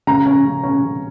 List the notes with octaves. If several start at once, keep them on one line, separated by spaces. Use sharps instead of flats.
C#3 A#5
C#4
C#3
C#4
C#3